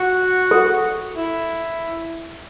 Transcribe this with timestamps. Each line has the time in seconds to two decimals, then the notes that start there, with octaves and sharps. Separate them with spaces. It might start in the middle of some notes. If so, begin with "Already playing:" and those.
Already playing: F#4
0.51 A4
1.15 E4